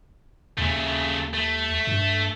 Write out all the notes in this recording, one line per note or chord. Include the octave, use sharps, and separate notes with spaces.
D#2 C#3 A3
A3
G2